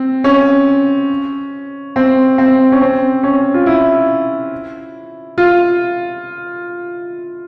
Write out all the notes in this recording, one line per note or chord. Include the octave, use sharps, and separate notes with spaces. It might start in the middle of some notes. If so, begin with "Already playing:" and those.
Already playing: C4
C#4
C4
C4
C#4
C4
C#4
F4
E4
F4